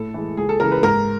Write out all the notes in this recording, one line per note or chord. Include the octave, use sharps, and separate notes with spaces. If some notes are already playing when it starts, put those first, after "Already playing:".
Already playing: A2 A4
E3 G#3
C#2 G#4
A4
C#3 E3 A#4
B4
G#2 A#4